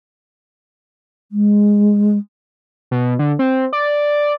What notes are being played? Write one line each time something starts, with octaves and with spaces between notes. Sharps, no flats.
G#3
B2
D3
C4
D5